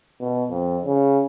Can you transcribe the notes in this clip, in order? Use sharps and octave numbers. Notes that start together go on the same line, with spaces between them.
B2
F2
C#3